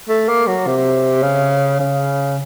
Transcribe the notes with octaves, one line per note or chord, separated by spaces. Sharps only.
A3
A#3
F#3
C3
C#3
C#3